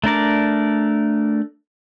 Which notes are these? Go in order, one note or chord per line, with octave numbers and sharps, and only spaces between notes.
A3 D4 A#4 D5